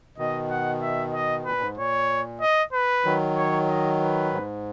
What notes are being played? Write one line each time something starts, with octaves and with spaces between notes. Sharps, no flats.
B2 D#3 D#5
F#5
E5
D#5
A#2 B4
G#2
A#2 C#5
D#5
B4
D#3 F#3
C#5
D#5
B4
G#2